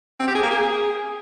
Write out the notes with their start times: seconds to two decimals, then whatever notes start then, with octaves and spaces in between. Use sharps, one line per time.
0.20 C4
0.27 G4
0.35 G#4
0.43 A#3
0.51 G#4